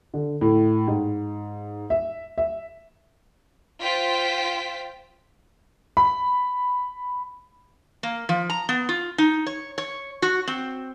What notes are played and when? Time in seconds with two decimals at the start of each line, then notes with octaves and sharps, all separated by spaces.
0.14 D3
0.41 A2
0.87 G#2
1.90 E5
2.38 E5
3.81 F4 C5 G5 B6
5.97 B5
8.03 A#3
8.29 F3
8.50 A#5
8.69 B3
8.89 F4
9.18 D#4
9.47 C#5
9.78 C#5
10.22 F#4
10.48 C4